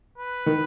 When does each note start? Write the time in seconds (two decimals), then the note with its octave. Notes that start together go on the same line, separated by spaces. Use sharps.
0.18 B4
0.46 D#3